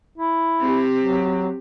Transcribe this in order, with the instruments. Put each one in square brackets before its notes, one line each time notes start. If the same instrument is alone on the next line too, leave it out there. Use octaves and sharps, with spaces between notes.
[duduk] E4
[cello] C4 G4
[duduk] F#3